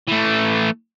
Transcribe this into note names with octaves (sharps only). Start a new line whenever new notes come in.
E3 A3